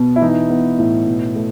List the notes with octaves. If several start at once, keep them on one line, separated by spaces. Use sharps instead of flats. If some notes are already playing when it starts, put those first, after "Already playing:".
Already playing: B2 B3
E4
E3 D#4
B3
A2
B2
A3